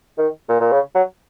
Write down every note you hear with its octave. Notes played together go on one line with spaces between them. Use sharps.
D#3
A#2
A#2
C#3
F#3